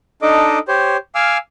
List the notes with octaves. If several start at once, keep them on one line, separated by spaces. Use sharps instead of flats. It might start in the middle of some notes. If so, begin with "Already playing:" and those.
D4 D#4 A4 D#5 D6
G4 C5 C#5
F5 G#5 D6 E6 F6